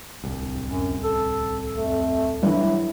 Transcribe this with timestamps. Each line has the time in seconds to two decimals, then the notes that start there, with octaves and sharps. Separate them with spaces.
0.24 D1 C2
0.68 F#2
1.04 A4
1.77 F2 A3
2.43 G2 E3 F#3 E4